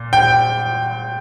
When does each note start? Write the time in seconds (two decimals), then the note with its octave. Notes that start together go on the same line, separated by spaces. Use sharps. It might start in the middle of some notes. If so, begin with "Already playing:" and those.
Already playing: A#2
0.13 G5